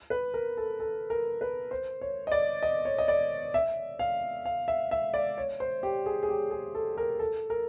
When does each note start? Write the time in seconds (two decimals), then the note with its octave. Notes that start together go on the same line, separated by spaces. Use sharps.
0.10 B4
0.34 A#4
0.57 A4
0.80 A4
1.10 A#4
1.41 B4
1.71 C5
2.01 C#5
2.27 D#5
2.32 D5
2.62 D#5
2.85 C#5
2.98 D#5
3.08 D5
3.54 E5
3.99 F5
4.45 F5
4.68 E5
4.91 E5
5.14 D5
5.38 C#5
5.60 C5
5.83 G4
6.06 G#4
6.23 G#4
6.29 G4
6.51 G#4
6.75 A4
6.98 A#4
7.19 A4
7.50 A#4